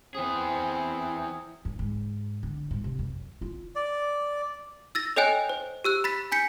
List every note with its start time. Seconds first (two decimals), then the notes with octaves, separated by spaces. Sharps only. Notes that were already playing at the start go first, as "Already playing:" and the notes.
0.15 E3 C4 G#4
1.65 F#2
1.79 G#2
2.43 D3
2.71 G#2
2.84 C3
2.99 F#2
3.41 F4
3.76 D5
4.95 E6 A6 A#6
5.16 A4 C#5 D#5 G5 G#5 F#6
5.49 C5
5.84 G4 E6 F#6
6.04 B5 A6 B6
6.32 G#5 G6 B6 C#7